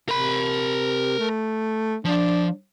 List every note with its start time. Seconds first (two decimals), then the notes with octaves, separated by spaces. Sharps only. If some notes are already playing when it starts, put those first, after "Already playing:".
0.09 C3 A#4 B5
1.19 A3
2.05 F3 D4